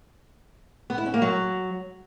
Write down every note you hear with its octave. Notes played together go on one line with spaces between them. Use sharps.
B3
E4
C#4
A#3
F#3